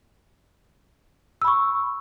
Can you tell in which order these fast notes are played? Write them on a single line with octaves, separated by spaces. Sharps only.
E6 B5 C#6